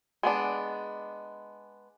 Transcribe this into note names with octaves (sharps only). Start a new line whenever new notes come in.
G#3 B3 D4